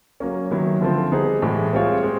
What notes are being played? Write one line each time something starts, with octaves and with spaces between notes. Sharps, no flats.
F#3 A#3 C#4
D#3 F#3 B3 E4
D3 F3 A3 C4
G3 B3 D#4 G#4 C5
A2 E3 G#3
G3 C4 F4 G#4 C#5
G#3 C4